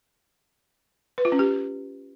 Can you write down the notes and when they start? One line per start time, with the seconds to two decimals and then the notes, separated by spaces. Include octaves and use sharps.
1.18 B4
1.25 F4
1.32 C#4
1.39 G4